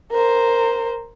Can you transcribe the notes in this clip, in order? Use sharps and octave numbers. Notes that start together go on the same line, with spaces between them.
A#4 C5